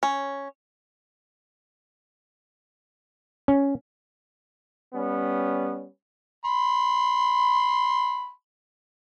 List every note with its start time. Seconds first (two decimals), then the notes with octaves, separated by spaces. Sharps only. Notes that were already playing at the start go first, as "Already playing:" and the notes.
0.03 C#4
3.48 C#4
4.94 G3 B3 C#4
6.45 B5 C6